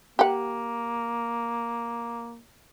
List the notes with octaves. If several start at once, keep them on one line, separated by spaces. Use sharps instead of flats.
A#3 G4 F#5